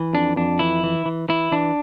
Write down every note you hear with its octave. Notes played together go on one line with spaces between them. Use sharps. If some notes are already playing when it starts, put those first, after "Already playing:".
Already playing: E3
F2 D4
F2 D4
E3 E4
E3
E3
E3 E4
E3 D4